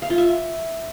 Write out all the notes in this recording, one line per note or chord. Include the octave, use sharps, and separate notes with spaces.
F5
F4
E5